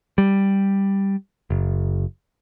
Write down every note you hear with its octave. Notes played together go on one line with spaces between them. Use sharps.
G3
F#1